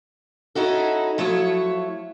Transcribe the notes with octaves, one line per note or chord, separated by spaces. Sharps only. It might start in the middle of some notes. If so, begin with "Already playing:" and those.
C#4 D#4 E4 F#4 A4
F3 F#3 A3 E4 C#5